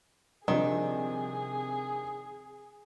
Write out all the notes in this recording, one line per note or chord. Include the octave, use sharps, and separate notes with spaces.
C3 D#3 F3 G3 D4 G#4